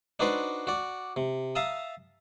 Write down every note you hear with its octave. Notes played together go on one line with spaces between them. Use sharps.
D4 D#4 F#4 B4 C5 D5
F#4 D5
C3
E5 F5 A5 A#5 D#6